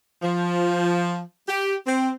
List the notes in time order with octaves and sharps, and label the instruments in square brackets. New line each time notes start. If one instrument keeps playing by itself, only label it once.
[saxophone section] F3
G4
C4